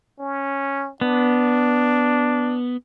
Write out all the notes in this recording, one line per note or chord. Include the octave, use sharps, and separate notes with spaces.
C#4
B3 D4